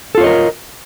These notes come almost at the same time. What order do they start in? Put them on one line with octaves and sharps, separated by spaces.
A4 F4 C#5 D#5 A#4